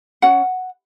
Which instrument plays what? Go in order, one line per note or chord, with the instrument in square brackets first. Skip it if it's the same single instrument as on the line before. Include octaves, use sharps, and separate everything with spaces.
[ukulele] C#4 F#4 F#5